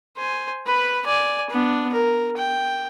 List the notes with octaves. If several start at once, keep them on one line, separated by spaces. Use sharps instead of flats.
C5 G#5
B4 B5
D5 G#5
B3 D4
A#4
G5